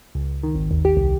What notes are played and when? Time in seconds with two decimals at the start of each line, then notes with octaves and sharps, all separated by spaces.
0.15 C#2
0.43 D#3
0.55 G#1
0.71 D#2
0.85 G4
0.97 C2